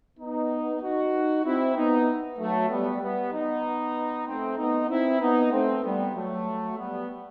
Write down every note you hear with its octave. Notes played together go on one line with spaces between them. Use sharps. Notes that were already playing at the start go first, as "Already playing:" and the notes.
B3 D#4
D#4 F#4
C4 E4
B3 D#4
F#3 A3
G3 B3
G3 B3
B3 D#4
A3 C4
B3 D#4
C4 E4
B3 D#4
A3 C4
G3 B3
F#3 A3
G3 B3